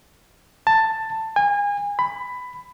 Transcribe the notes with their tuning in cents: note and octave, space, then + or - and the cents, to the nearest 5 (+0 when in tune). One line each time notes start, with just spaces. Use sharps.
A5 +10
G#5 -30
B5 +15